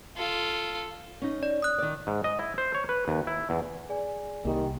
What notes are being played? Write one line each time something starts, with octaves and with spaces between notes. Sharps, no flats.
F4 A4
C#4 D#4
D5
D#6 F#6
D#3 D5
G#2
D#5
E4
C5
C#5
B4
D#2
E4
E2
G#4 D5 G#5
C2 D#3 A#3 G4